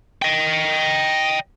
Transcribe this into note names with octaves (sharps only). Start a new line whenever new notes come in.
D#5 G5